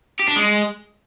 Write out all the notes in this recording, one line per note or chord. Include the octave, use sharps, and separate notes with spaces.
G4
D4
G#3